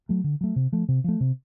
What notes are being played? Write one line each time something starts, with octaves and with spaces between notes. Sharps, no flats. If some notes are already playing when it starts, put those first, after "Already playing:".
F#3 A3
D3
F#3 A3
C3
F3 A3
C3
F3 A3
C3